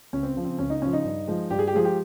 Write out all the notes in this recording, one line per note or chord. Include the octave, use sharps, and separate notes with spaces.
C#2 C#4
C4
C#3 F3
C4
C#2 C#4
D#4
C#3 F3 C#4
D#4
G2
F3 G#3
G2 G4
G#4
G4
F3 G#3 G#4
G4